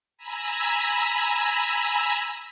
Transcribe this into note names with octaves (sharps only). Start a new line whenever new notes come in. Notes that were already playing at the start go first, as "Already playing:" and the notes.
G#5 A#5 B5 E6